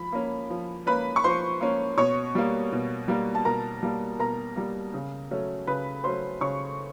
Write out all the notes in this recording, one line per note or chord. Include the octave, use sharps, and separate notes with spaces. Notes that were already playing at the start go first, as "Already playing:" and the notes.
Already playing: F3 B5
A#3 C#4
F3
A#3 C#4 B4 B5
C#6
F3 C5 C6
A#3 C#4
B2 C#5 C#6
G3 A#3
B2
G3 A#3
A5
B2 A#4 A#5
G3 A#3
B2 A#4 A#5
G3 A#3
C#3
F#3 A3 C#4
C#3 B4 B5
F#3 A3 C#4 C5 C6
C#3 C#5 C#6